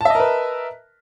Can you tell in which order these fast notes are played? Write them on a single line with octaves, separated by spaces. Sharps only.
A5 E5 D#5 A#4 B4